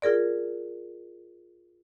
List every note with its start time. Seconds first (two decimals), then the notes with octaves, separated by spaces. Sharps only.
0.02 F4 G#4 A#4 D5